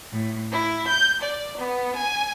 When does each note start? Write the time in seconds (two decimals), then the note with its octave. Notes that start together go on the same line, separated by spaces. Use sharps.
0.11 A2
0.50 E4
0.87 G6
1.20 D5
1.57 B3
1.95 G#5